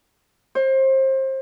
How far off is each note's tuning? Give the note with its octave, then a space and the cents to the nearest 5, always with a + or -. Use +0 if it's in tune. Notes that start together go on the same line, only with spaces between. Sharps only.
C5 +30